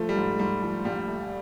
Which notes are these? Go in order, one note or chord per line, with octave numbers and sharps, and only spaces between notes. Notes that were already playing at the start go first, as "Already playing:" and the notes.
Already playing: F3 A3
G3
G#2
G#2 G3
F3
A#1 G3
A3